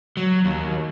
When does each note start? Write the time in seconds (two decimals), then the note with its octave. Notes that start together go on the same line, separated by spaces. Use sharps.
0.17 F#3
0.45 D#2